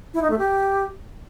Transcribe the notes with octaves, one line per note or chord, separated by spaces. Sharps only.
E4
D#4
A3
G4